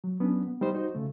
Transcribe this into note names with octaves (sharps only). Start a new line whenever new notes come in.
F#3
F#3 B3 C#4 D4
B3
G3 D#4 C5
D#4 F#4 C5
C#3 A3